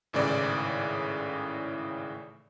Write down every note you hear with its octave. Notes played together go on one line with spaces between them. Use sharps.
G#1 A2 C#3 E3 D5